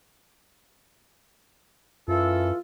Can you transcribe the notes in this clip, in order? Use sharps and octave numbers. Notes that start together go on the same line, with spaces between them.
F#2 E3 F4 A4